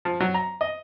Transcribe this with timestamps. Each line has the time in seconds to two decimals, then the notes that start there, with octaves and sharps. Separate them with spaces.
0.05 F3
0.20 F#3
0.34 A#5
0.61 D#5